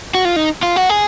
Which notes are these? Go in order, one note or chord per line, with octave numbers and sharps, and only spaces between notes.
F#4
F4
D#4
F4
F#4
G#4